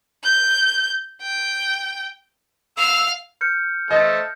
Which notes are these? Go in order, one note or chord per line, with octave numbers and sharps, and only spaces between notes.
G6
G5
F5 E6
F6 G6 C#7
A3 C5 D#5 A5